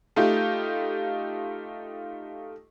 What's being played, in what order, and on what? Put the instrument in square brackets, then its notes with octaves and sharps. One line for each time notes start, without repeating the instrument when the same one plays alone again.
[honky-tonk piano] A3 D#4 F4 G4